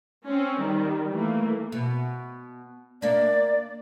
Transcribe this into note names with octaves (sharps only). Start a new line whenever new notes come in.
C4 C#4
D#3 G3
E3 A3 A#3
B2
A#3 D4 D5